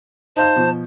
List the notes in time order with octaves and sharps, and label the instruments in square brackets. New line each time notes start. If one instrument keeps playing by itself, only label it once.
[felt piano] D#4 F5 G6 [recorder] C5 [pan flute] A5
[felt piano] B2 F3